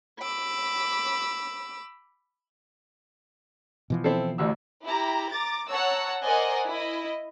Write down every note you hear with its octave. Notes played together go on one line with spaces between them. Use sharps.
B5 D6 E6
B2 E3 F3
C4 E4 A4
A1 D2 E6
E4 G4 A#5
A#5 D6 A6
C#5 F#5 A5 A#5 E6
A#4 C5 D5 D#5 F#5 G#5
E4 D#5